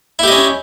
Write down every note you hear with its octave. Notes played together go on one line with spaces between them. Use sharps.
C#4 E4 G4 D#5